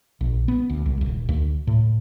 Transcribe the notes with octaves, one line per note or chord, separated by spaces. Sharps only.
A#1
B3
D2
C2
D#1
D2
A2